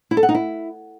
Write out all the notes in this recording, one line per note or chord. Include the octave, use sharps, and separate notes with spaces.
E4
A4
F#5
D#4
E4